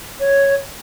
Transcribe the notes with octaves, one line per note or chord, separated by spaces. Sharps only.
C#5